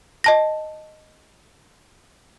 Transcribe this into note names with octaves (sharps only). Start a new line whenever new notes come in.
D#5 A5 A#6